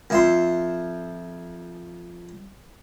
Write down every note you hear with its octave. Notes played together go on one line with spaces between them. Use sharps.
F2 E5 C6